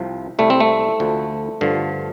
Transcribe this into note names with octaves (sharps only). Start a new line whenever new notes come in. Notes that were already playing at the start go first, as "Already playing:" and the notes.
Already playing: C2 C3 F3
C2 C3 G3 A3
C4
A3
D2 D3 F3
G2 D3 F3